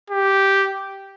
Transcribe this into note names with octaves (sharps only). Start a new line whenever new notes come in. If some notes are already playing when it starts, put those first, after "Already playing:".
G4